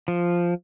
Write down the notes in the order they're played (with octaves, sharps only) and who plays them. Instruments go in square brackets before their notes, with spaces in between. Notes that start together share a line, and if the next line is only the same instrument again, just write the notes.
[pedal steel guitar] F3